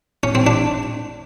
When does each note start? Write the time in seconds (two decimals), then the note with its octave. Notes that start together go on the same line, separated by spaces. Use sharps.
0.23 C#4
0.35 C4
0.47 D4